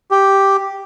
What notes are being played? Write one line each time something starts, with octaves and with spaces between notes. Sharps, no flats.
G4